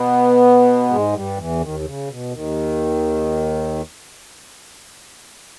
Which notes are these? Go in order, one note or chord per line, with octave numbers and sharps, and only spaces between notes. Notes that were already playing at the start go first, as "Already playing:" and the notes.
Already playing: B2 B3
G#2 G#3
G2 G3
E2 E3
D#2 D#3
D#3
C#3
B2
D#2 D#3